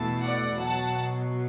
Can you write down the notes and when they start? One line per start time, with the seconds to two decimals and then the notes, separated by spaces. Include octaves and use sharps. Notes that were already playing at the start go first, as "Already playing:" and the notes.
Already playing: E2 B2 A3 E4 A5
0.24 D5 F#5
0.61 B2 F#3 F#5 A5